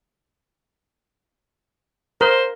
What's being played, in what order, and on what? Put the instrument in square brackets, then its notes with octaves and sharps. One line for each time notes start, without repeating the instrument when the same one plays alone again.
[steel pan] A#4 [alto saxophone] C5